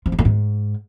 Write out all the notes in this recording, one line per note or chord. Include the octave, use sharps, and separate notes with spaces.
F3
G#2
A2
G#2